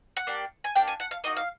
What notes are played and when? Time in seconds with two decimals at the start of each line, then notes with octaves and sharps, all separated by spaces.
0.17 F#5
0.27 A#3 D4 G4
0.64 G#5
0.76 A#3 D4 G4 G5
0.88 G#5
1.00 F#5
1.11 F5
1.24 A#3 D#4 F#4 D#5
1.36 F5